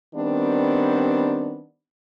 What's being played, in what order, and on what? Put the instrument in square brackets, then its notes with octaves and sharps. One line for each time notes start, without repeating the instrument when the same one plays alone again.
[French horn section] D#3 G3 B3 C4 D4